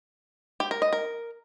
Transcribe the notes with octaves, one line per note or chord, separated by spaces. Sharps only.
G4
A#4
D#5
A#4